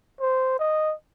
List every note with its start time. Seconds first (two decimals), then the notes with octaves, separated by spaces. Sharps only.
0.20 C5
0.59 D#5